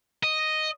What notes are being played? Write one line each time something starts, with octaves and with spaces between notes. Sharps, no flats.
D#5